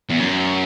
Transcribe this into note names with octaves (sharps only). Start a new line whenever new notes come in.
E2
F#2